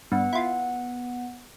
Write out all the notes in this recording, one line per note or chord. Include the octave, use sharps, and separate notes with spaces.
G2 B3 F#5
E4 F4